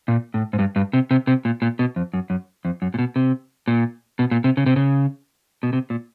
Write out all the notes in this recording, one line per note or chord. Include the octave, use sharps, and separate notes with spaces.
A#2
A2
G#2
G2
G2
C3
C3
C3
A#2
A#2
B2
F2
F#2
F#2
F2
F#2
A#2
B2
C3
A#2
B2
A#2
C3
C#3
C3
C#3
B2
C3
A#2